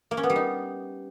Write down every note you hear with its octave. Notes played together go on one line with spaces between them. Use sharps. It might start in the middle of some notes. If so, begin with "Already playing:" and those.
A#3
C#4
B3
G3
D#4